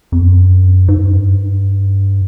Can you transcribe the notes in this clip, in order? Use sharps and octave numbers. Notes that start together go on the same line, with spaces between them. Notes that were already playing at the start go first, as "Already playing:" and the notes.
F2
F#2
G#2
G2
F#2
G2